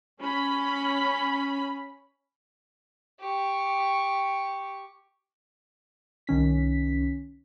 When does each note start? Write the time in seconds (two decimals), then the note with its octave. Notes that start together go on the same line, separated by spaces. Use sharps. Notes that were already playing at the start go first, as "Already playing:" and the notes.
0.20 C#4 B5
3.20 G4 C#6
6.27 C2 D#3 C#4 B6